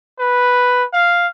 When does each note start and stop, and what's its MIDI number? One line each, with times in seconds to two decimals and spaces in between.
0.19 0.84 71
0.93 1.27 77